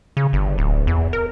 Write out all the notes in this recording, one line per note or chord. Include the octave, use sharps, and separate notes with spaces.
C#3
G1
D1
E2
A#4